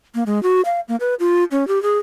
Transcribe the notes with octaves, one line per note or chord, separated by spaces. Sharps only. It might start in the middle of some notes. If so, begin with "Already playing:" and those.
A#3
G#3
F#4
F5
A#3
B4
F4
C#4
G4
G#4